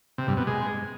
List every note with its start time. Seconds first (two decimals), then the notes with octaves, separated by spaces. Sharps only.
0.18 C3
0.28 G2
0.37 B2
0.47 G#3